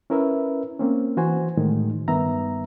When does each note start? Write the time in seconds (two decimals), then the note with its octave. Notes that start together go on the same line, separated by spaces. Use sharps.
0.10 C#4 E4 A#4 B4 E5
0.79 A#3 C4 C#4
1.17 E3 F#4 C5 G#5
1.57 A2 D#3 G#3
2.08 G2 D#3 B3 E5 A#5